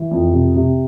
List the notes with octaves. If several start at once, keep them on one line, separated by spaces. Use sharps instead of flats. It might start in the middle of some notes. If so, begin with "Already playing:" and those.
Already playing: E3
F2
C3
C3